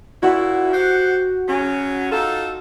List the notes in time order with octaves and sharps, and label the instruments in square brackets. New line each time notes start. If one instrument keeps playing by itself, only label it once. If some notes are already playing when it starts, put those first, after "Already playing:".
[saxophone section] A#2 E4 [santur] F#4
[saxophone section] G4 C5 F#5
C#3 F#3 C#4
D#4 F4 A4